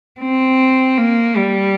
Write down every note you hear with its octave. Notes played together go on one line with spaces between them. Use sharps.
C4
A#3
G3